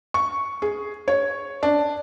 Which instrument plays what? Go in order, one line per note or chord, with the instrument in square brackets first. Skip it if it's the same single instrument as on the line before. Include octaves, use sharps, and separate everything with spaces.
[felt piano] C#6
G#4
C#5
D4